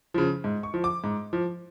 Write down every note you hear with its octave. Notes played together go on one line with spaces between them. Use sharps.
C#3 F3
G#2
C#6
F3
D6
G#2
F3